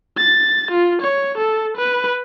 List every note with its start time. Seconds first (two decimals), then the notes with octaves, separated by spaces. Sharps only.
0.18 A6
0.71 F4
1.02 C#5
1.38 A4
1.77 B4